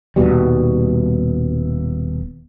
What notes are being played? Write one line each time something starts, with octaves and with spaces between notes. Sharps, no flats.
D#1 G#1 B2 G3